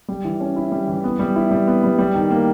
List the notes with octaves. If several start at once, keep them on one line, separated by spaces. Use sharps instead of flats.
G3
E3
C#4
E4
G3
E3
B3
G3
E4
G3
B3
G3
G3
D#3
A#3